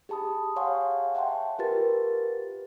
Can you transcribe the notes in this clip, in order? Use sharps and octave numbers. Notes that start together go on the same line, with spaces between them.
G4 G#4 A5 B5 D#6
C#5 F5 F#5 G#5 C6 C#6
E5 F#5 G5 A5 C6
F4 G4 A#4 B4 A6